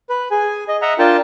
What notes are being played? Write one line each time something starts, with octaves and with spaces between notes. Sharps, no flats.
B4
G#4 G#5
D#5
D#5 E5 F#5 A#5
D4 F4 A#4 G5 A5